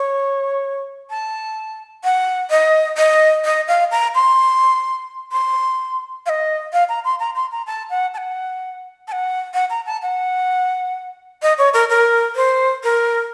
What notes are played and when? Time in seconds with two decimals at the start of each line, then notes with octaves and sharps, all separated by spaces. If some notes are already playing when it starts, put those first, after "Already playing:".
Already playing: C#5
1.10 A5
2.04 F#5
2.50 D#5
2.97 D#5
3.45 D#5
3.68 F5
3.91 A#5
4.15 C6
5.32 C6
6.26 F5
6.29 D#5
6.73 F5
6.89 A#5
7.04 C6
7.19 A#5
7.35 C6
7.51 A#5
7.67 A5
7.90 F#5
8.14 A5
8.18 F#5
9.08 A5
9.12 F#5
9.54 F#5
9.70 A#5
9.86 A5
10.02 F#5
11.42 D#5
11.58 C#5
11.74 A#4
11.89 A#4
12.36 C5
12.84 A#4